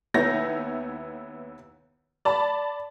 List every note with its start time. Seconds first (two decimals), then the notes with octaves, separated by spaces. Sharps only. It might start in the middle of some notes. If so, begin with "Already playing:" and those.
0.14 D#2 B3 E4 C#5 G6 A#6
2.25 D5 A5 B5